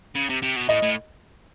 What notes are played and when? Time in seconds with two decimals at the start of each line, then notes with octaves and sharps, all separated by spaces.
0.15 C#3
0.29 C3
0.42 C3
0.56 B2
0.69 A2 D#5
0.82 A2